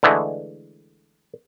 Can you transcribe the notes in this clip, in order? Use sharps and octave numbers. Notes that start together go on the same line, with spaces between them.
D3 E3 G#3 A3